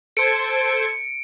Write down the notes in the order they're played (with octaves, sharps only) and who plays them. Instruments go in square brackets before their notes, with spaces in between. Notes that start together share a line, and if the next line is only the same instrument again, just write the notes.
[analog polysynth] A4 C5 G#6 [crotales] C#7 D7